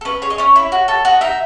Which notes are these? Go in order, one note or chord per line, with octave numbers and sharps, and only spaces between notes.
A4
C#4 B4
G#4 C#5
D#5
C#4 C#5
E4
F#4
A4
F#4 D#5
D#4 E5